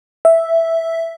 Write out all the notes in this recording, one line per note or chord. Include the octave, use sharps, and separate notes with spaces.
E5